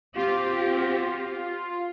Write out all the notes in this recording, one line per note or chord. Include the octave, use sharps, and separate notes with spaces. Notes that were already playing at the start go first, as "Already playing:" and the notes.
C4 F4 G4